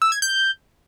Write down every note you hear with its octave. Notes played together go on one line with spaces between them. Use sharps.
E6
G#6
G6